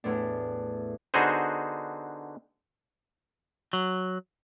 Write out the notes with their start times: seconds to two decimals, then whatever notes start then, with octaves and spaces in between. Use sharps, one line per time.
0.04 E2 A2 A3 D4
1.14 D3 B3 D#4 F#4 G#4 C5
3.73 F#3